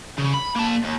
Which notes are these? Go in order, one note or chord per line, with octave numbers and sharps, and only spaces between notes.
C#3
B5
A#3 A5
D#2